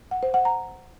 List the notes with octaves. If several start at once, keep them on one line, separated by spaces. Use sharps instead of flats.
F#5
C5
F#5
A#5